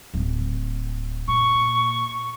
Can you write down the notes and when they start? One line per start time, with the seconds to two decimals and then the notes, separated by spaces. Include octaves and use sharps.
0.14 D1
1.28 A#2 C#6